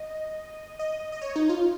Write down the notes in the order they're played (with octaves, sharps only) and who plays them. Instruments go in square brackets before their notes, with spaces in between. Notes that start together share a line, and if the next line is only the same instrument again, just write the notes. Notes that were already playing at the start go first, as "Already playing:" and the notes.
Already playing: [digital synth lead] D#5
D#5
D#5
C#5
D#4
F4